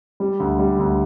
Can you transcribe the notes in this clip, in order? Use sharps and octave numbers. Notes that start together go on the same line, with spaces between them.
G3
D2
G3
D2